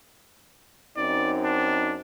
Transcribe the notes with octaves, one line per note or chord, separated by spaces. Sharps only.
F#2 C4 D#4 D5
D4